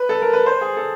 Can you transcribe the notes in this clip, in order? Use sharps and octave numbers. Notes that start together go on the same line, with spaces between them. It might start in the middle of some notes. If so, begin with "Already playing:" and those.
Already playing: B4
A4
A#4
B4
C5
G#4
A4